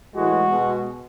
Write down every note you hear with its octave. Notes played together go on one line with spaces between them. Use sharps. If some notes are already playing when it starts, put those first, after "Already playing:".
A2 E3 G#3 F#4
B2 G#3